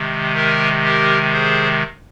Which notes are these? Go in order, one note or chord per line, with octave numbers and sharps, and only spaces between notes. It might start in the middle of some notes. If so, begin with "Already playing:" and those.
Already playing: C3 D#3 G#3
G4 A#4
G4 A#4
G#4 C5